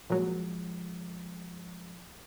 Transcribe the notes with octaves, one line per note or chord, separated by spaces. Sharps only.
A#2 F3 F#3 G#3